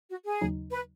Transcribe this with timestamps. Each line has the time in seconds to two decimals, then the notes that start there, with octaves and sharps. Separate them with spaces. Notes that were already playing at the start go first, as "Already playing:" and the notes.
0.09 F#4
0.25 G#4
0.41 D#2 C#3 F#3 D#4
0.71 B4